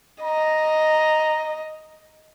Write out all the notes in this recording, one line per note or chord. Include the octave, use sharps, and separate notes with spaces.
D#5 A#5